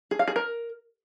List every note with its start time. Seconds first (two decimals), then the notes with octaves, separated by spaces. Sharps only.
0.11 G#4
0.19 F5
0.28 G#4
0.36 A#4